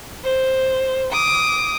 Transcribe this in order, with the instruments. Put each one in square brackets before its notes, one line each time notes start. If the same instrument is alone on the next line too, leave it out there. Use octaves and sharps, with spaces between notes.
[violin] C5
D6 D#6